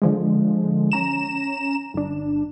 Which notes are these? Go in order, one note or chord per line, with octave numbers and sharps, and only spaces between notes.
D3 F3 G#3
C#4 A#5 E7
G1 D4